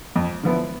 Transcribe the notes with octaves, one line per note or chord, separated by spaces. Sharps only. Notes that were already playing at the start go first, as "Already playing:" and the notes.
F2
D3 F3 B3 E4